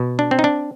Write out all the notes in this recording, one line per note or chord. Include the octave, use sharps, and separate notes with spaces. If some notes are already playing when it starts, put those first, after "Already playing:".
Already playing: B2
D4
C4
D#4
D4